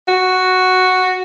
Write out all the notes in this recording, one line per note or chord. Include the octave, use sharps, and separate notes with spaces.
F#4